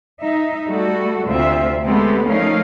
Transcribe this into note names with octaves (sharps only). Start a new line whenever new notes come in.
D#4 E5
G3 A3 F#4 A4
D2 C3 C4 F4 E5
G#3 A3 B3 C4 G4 A4
F3 A3 C#4 D#4 A#4 F5